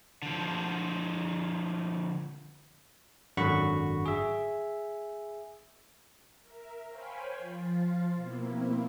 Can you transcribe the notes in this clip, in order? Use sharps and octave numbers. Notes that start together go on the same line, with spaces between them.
D3 F3
G#1 F#2 D3 F#4 B5 C#6
G#4 E5
A#4 E5
C5 C#5 F5 G5 G#5 B5
F3 F4
B2 A#3 C4 E4